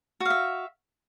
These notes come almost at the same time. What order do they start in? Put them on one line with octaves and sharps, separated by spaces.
F#4 F5 E5